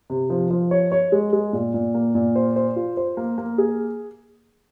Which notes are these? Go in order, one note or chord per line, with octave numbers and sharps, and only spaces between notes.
C3
F3
F3
C#5
C#5
G#3
G#3
A#2
A#2
A#3
A#2
C5
C5
F4
C5
A#3
A#3
G#4